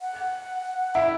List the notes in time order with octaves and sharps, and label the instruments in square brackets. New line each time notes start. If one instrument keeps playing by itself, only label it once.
[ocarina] F#5
[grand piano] E4 [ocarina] E5